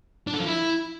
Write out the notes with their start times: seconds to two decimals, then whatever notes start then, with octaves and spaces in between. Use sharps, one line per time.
0.27 D4
0.34 A4
0.40 F3
0.46 E4